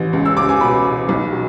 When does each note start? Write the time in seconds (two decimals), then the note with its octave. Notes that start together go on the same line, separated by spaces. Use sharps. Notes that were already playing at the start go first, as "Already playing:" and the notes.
Already playing: A1 E3
0.13 C#2
0.26 E6
0.37 C#2 D6
0.49 G#5
0.61 B2 B5
0.84 B2
1.09 B1
1.33 B2